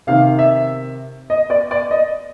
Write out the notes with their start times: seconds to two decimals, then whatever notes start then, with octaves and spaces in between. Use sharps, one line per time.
0.07 C3 D#3 F5
0.39 E5
1.30 D#5
1.50 D5
1.71 D5
1.91 D#5